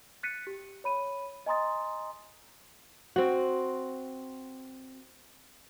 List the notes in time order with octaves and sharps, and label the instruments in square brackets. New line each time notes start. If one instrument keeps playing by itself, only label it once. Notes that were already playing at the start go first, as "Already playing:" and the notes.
[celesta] F#6 A6 B6 C#7 D#7
G4
C#5 B5 D#7
D#5 G#5 A#5 C6 D#6 A6
[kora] C4 F#4